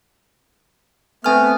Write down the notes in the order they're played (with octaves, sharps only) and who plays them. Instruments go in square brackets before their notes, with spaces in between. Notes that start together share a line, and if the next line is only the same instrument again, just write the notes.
[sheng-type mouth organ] A3 B3 [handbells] C4 G#5 F6